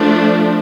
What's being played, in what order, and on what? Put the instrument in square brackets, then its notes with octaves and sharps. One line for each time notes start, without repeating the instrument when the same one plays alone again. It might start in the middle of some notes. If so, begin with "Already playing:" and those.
Already playing: [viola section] F3 A3 D4